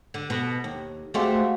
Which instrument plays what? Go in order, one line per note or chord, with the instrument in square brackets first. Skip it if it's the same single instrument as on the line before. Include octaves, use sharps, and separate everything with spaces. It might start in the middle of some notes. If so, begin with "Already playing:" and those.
[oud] D3
[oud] B2 [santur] A4
[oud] D#2
[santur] G#3 F#4 F5 [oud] A3 C4 G4